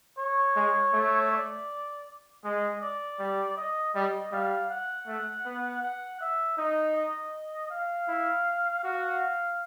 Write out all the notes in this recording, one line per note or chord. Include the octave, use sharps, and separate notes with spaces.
C#5
G#3
A3
D5
G#3 D#5
D5
G3
D#5
G3 D#5
G3 F5
F#5
A3
B3
F#5
E5
D#4 D#5
D#5
F5
E4
F#4 F5